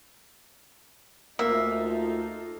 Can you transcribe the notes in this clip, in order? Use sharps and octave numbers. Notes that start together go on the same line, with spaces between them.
D2 A#3 D#4 F4 A4 E5